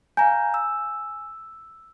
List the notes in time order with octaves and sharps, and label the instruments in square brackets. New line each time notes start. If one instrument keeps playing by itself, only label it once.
[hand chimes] F5 A#5 G6 [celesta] G#5
[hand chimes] E6